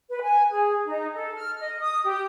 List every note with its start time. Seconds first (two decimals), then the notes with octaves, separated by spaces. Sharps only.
0.10 B4
0.23 G#5
0.50 G#4
0.87 D#4
1.15 A4
1.35 F6
1.60 D#5
1.80 D#6
2.04 G4